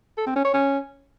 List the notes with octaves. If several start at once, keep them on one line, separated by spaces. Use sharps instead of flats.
A4
C4
C#4
C#5
C#4